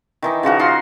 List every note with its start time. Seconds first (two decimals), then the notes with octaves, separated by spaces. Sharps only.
0.22 D#3 E3 D#4
0.43 C#3 F3 F#4 A#4
0.59 D#4 F4 F#5 C6